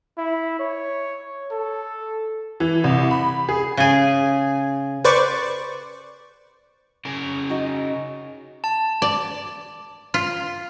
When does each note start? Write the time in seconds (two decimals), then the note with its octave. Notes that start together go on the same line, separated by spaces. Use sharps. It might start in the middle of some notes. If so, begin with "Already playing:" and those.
0.18 E4
0.60 C#5
1.52 A4
2.60 E3
2.84 C2
3.11 B5
3.49 G#4
3.77 C#3 G#4
5.05 B4 C5 D5 C#6 D6
7.05 C#3 A#4
7.50 D#4 F#4
8.64 A5
9.02 D5
10.14 F4